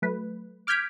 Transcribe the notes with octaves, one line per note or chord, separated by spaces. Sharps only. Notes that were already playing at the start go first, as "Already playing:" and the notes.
F#3 A3 B4
D6 F6 G6 G#6 B6 D7